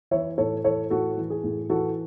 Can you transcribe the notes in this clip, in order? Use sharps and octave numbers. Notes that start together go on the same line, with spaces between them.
E3 C#5 E5
A2 A4 C#5
E3 A4 C#5
A2 F#4 A4
E3
G#4
A2
E3 F#4 A4